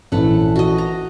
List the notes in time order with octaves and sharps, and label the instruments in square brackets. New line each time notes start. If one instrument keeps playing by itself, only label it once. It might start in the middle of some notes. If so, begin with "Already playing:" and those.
[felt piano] A#1 E3 C#4 [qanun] A3 F#5
[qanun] F#4 D#5
A#5